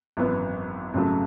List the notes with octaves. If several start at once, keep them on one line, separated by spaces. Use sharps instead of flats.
G#1 F#2 E3 B3 E4
G#1 F#2 C#3 F#3 A3